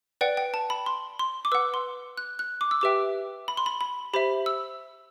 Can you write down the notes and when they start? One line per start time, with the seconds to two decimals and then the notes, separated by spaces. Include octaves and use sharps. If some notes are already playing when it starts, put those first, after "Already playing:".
0.21 B4 D5 F#5 G5
0.37 G5
0.54 A5
0.70 B5
0.86 C6
1.19 C6
1.45 D6
1.52 B4 F#5 E6
1.74 C6
2.17 F#6
2.39 F#6
2.61 D6
2.71 E6
2.81 G4 B4 E5 G5 D6
3.48 B5
3.57 C6
3.66 B5
3.81 B5
4.13 G4 C5 E5 B5
4.46 E6